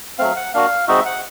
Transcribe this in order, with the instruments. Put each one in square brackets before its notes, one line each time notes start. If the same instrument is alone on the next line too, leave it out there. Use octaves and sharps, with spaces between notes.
[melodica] F#3 A3 C4 F5
F#5
A#3 D4 F#4 F5
G#3 C4 D#4 F#4 E5
F#5